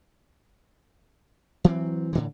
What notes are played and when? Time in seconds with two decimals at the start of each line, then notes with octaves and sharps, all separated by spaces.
1.64 E3 F#3 G#3 C4
2.13 A2 D3 E3